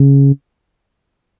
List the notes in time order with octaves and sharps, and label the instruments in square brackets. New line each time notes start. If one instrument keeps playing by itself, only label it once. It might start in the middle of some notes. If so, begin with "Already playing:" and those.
Already playing: [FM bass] C#3